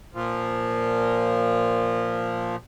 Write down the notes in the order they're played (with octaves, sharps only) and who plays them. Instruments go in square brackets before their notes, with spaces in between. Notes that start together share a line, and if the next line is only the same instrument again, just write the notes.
[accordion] A#2 F3